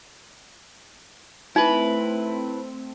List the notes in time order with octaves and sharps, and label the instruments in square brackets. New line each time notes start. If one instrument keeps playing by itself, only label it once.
[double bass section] A3 C4 [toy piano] D#4 [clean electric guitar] E4 B4